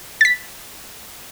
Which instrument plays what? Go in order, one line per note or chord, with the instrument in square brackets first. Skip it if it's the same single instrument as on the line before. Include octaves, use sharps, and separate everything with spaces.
[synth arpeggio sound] A6 B6